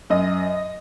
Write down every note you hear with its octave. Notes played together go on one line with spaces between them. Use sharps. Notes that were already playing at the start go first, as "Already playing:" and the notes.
F#2 D#5